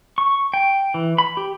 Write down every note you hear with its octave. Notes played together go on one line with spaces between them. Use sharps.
C#6
G5
E3
B5
G4